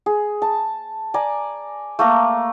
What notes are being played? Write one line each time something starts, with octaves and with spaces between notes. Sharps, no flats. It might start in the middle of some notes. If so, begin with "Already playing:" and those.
G#4
A5
D5 G#5 A#5
A3 A#3 A#5